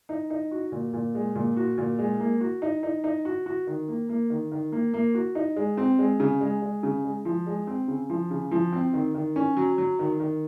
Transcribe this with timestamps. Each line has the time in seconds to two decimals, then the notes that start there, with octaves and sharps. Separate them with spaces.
0.09 D#4
0.30 D#4
0.51 F#4
0.72 A#2
0.93 A#2
1.15 G#3
1.35 A#2
1.56 F#4
1.78 A#2
1.98 G#3
2.20 A#3
2.40 F#4
2.62 D#4
2.83 D#4
3.04 D#4
3.25 F#4
3.46 F#4
3.67 D#3
3.88 A#3
4.09 A#3
4.30 D#3
4.52 D#3
4.72 A#3
4.94 A#3
5.14 F#4
5.35 D#4
5.56 G#3
5.77 C4
5.99 G#3
6.20 C#3
6.41 G#3
6.62 G#3
6.83 C#3
7.04 G#3
7.25 F3
7.47 G#3
7.67 C4
7.88 C#3
8.10 F3
8.31 C#3
8.51 F3
8.72 C4
8.94 D#3
9.15 D#3
9.36 C#4
9.57 F#3
9.78 F#3
9.99 D#3
10.20 D#3